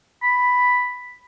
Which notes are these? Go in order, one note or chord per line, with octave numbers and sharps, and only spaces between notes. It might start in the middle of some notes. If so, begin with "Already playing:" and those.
B5